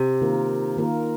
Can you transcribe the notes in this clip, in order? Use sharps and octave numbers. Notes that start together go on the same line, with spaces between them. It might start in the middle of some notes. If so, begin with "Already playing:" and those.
Already playing: C3
D#3 A#3 F4 A#4
D#3 A#3 F4 A#4